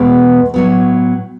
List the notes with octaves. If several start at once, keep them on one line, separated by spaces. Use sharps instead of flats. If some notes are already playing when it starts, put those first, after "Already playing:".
Already playing: E2 B2 G#3 B3
A2 F#3 B3